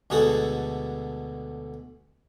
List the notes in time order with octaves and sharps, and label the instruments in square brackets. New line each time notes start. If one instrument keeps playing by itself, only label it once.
[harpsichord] D2 B2 G#3 F#4 G#4 A4